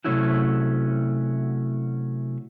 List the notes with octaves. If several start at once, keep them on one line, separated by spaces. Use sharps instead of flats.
C3 F#3 A3 C#4 E4 F#4